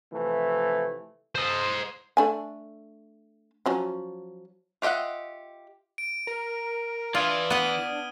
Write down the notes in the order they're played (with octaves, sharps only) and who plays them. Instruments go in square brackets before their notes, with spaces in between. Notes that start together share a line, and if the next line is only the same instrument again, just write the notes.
[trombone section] C3 E3 F3 A3
[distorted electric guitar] C5 D#5
[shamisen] A3 D4 G#5
F3 F#3 C#4
[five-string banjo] F4 G4 D#5 E5 F#5
[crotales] D7
[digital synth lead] A#4
[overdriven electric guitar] E3 [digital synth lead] D4 [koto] F4 [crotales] D#6 F6 G#6
[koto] B3 F#5 [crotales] D#7 G7